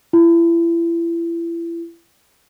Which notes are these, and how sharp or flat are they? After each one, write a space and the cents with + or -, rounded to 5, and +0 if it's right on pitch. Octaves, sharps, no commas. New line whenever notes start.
E4 +30